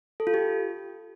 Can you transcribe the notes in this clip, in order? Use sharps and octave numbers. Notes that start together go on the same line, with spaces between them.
A4
F4
G4